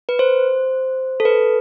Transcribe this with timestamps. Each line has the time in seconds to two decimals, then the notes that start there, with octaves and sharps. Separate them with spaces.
0.09 B4
0.19 C5
1.20 A4
1.25 B4